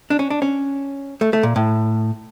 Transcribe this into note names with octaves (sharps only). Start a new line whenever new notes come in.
D4
C#4
D4
C#4
A3
A3
A#2
A2